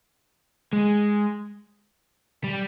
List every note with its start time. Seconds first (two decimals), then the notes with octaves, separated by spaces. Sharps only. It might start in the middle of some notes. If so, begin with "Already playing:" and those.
0.73 G#3
2.44 G3